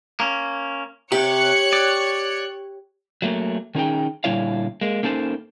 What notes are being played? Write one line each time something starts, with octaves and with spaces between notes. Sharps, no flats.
A#3 C#4
C3 G4 C#5 F#6 C#7
D5
F#3 A3 A#3
D#3 C#4 D#4 G#4 G5
A#2 D3 G3 E4 C#5 F5
G#3 A#3
A#3 C#4 D#4 A4 C5